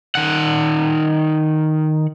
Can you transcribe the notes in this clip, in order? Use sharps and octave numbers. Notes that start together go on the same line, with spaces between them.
D#3 F#5